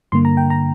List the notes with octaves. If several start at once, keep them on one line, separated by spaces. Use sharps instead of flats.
G2 D3 A#3 C6
A#5
G5
A#5